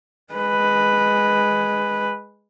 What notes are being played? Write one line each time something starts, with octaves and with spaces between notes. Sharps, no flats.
G#3 B4